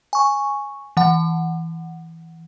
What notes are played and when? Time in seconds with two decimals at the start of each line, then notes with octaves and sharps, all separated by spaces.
0.13 G#5 C#6
0.97 E3 F#5